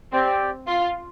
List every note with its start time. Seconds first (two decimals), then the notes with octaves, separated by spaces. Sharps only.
0.12 C4 G4 D5 G5
0.67 F4